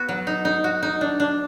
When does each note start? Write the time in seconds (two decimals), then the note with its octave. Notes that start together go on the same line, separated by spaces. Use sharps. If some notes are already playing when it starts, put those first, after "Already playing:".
Already playing: B3 F#4
0.09 F#3
0.27 D#4
0.45 D#4
0.64 F#4
0.83 D#4
1.01 D4
1.20 D4